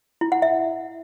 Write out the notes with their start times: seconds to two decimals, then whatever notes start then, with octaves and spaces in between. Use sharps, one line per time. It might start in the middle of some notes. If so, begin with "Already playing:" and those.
0.21 E4
0.32 F#5
0.42 E5